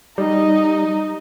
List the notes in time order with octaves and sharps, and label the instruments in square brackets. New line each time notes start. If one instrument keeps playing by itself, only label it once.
[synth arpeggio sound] G3 [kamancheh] D#4